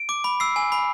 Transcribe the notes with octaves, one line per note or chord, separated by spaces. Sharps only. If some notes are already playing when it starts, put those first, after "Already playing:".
Already playing: D7
D6
B5
E6 C7
G#5
B5